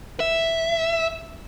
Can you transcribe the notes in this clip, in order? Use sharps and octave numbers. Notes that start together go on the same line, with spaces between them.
E5